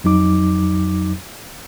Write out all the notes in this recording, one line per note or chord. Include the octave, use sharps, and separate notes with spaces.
F2 F#3 D#4 D6